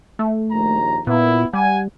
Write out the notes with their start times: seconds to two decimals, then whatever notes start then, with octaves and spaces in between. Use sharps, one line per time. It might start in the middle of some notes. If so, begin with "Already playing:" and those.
0.19 A3
0.51 A#1 D#2 A#5
1.07 A#2 B3 E4
1.53 G3 F#5 G#5